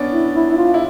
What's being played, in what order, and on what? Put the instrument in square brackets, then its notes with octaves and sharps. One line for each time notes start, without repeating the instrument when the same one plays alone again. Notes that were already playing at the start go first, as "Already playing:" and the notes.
Already playing: [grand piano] B3 C#4 D4
[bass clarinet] E4
E4
E4
F4
[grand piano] E4